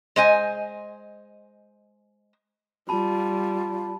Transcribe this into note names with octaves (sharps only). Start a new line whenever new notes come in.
G#3 C5 D#5 G#5
G3 F4 A5 B5